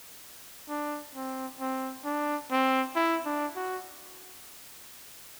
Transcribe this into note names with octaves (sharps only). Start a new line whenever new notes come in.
D4
C4
C4
D4
C4
E4
D4
F#4